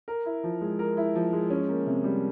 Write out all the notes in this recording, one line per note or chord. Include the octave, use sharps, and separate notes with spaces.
A#4
E4
F3
G#3
A#4
E4
F3
G#3
C#4
A#3
C3
G3